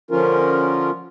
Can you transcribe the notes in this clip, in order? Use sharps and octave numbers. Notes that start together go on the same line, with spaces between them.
D3 F3 C#4 F4 A#4